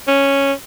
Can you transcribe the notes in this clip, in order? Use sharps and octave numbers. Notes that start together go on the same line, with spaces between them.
C#4